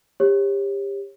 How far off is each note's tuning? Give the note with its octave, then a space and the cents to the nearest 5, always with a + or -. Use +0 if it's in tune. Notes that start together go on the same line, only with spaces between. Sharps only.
G4 +25 C#5 -25